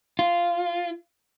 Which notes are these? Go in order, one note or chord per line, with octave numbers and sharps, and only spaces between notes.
F4